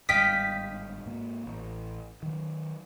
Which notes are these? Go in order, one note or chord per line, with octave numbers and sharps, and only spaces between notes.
G1 G#2 G3 D#5 F5 G5 B6
G#2 A#3
A1
D#3 F#3